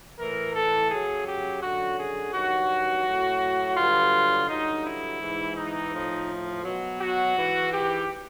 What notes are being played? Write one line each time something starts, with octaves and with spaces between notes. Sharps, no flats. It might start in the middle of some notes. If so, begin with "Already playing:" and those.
A2 E3 A#4
A4
F#2 C#3 F#3 G#4
G4
F#2 D3 F#3 F#4
G#4
G2 D#3 F#3 F#4
A2 F#3
G2 D3 F#3 F4
G2 D3 F#3 D#4
E4
G#2 E3
D#4
A2 F3
B2 F#3
F#4
G#2 E3
G4